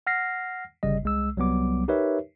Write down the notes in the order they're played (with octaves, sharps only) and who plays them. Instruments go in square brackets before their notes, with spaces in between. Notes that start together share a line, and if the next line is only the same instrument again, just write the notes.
[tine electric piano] F#5 F6 A#6 C7
G1 C#3 G3 D#5
C2 G#3 E6
C2 F#3 G3 B3 D6
D#4 G4 A#4 B4 C#5 E5